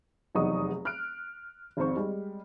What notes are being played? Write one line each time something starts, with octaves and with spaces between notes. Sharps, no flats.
F1 E2 F#3 D#4 C#6 D#6
F6 F#6 D7
G#1 F2 G#2 C5 C#6
G3 G#3